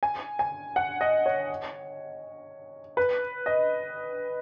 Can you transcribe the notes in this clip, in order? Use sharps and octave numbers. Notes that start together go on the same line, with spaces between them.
G#5
G#5
F#5
D#5
C#5
B4
D#5